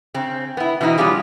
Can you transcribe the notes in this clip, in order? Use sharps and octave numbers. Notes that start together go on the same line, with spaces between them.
C#3 C4
B3 E4
B2 E3 C4 D#4 E4
G3 B3 C#4 F4 G4 G#4